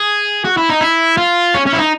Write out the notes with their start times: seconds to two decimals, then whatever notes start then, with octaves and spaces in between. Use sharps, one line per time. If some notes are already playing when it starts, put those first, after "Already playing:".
Already playing: G#4
0.45 F#4
0.57 E4
0.70 D#4
0.81 E4
1.17 F4
1.55 C#4
1.67 C#4
1.73 E4
1.79 D#4